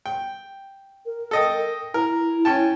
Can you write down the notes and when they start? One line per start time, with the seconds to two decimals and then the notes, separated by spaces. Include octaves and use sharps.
0.06 G5
1.06 A#4
1.31 A4 D#5 G5
1.94 E4 A#4
2.45 C#4 G5 A5